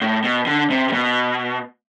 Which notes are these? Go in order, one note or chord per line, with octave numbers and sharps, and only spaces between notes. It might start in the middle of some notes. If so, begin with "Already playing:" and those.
A2
B2
D3
C3
C3
B2